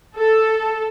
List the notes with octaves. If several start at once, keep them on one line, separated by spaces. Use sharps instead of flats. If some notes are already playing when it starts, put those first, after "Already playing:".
A4